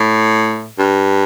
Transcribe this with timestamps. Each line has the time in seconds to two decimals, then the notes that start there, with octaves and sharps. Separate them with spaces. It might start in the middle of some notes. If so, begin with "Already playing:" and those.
Already playing: A2
0.79 G2